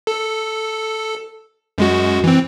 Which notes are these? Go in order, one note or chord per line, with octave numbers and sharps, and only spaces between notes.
A4
F#2 G#3 F#4
E3 C4